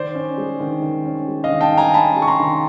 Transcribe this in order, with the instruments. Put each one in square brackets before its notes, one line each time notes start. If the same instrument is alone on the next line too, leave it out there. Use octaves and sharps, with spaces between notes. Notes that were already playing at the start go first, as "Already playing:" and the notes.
Already playing: [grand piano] D#3 C5 D5
C#4
G#3
D#3
D#3
C#4
G#3
D#5 F5
D#3
G5 A5
D#3
G#5 A#5
C#4 A5 B5
G#3
C#6
A#5 C6
D#3